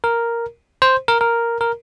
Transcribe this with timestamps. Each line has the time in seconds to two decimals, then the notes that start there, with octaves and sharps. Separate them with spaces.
0.04 A#4
0.82 C5
1.08 A#4
1.21 A#4
1.61 A#4